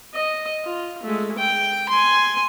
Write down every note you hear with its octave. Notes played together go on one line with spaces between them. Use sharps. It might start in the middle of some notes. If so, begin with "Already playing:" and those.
D#5
F4
G#3 A3
G5
G#5 C6